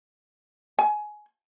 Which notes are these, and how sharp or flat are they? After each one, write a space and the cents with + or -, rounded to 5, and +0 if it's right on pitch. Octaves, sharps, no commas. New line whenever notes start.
G#5 +20